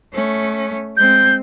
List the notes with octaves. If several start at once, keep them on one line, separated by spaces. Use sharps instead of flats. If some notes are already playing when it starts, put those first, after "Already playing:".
A3 C#4
G#3 C4 G6